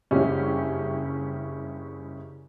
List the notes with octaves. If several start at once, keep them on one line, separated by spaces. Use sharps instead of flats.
F#1 G2 C#3 C#4 E4 G4